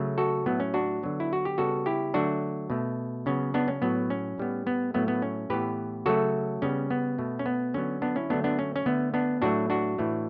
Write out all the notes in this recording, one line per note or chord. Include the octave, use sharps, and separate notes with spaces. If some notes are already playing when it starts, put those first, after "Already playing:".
Already playing: C#3 F#3 A3
F#4 A4
A2 F#3 A3 B3
C#4
D4 F#4
D3 F#3 B3
E4
F#4
G4
C#3 G3 B3 F#4 A4
E4 G4
D3 F#3 A3 D4 F#4
B2 A3
C#3 F#3 B3 C#4
B3 D4
C#4
A2 F#3 B3
C#4
A2 G3 B3
B3
A2 F#3 A3 B3
B3
C#4
A2 E3 B3 G4 B4
C#3 F#3 A3 F#4 A4
C#3 G3 B3 C#4
B3
B2 A3
C#4
B3
D3 F#3 B3 C#4
B3 D4
C#4 E4
D3 F#3 A3 B3 D4
B3 D4
C#4
C#4
D3 A3 B3
B3 D4
A2 F#3 A3 D4 F#4
D4 F#4
A2 E3 A3